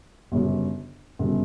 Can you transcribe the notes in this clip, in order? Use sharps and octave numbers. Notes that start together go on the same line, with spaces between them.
G1 F#2 C#3
G1 F#2 C#3